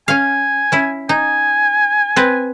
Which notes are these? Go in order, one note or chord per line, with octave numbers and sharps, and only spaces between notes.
C#4 F5 G#5
C#4 E4
D#4 G#5
C4 B4